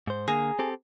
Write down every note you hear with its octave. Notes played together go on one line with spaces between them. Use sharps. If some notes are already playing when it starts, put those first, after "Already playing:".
G#2 C5
D3 A#3 G#4 A#5
C4 G4 A4